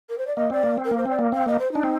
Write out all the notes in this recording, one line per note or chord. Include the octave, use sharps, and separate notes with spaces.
A#4
C5
D5
A#3 D#5
C4 D5
A#3
C4
A#4
A#3
C5
C4 D5
A#3
C4 F5
A#3 D#5
C5
D4 D#4
C4